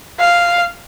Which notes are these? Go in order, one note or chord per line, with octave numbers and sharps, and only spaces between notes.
F5